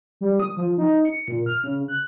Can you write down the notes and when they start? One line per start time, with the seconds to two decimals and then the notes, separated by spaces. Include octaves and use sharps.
0.21 G3
0.40 D#6
0.57 F3
0.78 D#4
1.05 C#7
1.28 A#2
1.46 F6
1.64 C#3
1.88 F#6